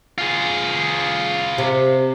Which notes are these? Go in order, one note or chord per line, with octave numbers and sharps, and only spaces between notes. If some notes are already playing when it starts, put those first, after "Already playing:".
F4 G#4
C3